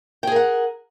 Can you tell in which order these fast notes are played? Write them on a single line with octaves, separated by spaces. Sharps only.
G5 G#4 A#4 F#5